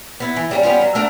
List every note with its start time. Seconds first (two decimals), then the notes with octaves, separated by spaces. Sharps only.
0.20 B3 E4
0.36 E3
0.51 G3 A#3 C#4
0.63 G3 B3 C#4 F4
0.81 F#3
0.95 A3 D4 A#4 F#5